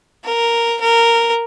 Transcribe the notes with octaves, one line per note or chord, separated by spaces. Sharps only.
A#4
A#4